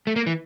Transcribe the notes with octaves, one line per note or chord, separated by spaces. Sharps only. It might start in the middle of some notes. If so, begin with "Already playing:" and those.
A3
A#3
E3